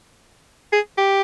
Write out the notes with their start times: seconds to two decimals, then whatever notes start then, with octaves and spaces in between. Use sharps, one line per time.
0.73 G#4
0.98 G4